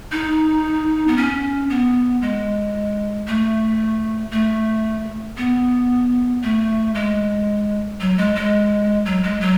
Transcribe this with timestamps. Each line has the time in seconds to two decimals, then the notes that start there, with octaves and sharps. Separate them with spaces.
0.12 D#4
1.08 B3
1.17 C#4
1.70 B3
2.22 G#3
3.27 A3
4.32 A3
5.37 B3
6.43 A3
6.95 G#3
8.00 F#3
8.18 G#3
8.35 G#3
9.06 F#3
9.23 G#3
9.40 F#3